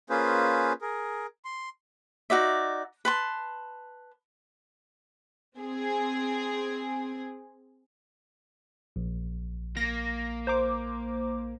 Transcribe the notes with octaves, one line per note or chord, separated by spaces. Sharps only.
A#3 C#4 F4 G#4 B4 C5
G#4 A#4
C6
D#4 F#4 D5 E5
B4 A5 C6
C4 G#4
A#1
A#3 A#6
C5 A#5 D6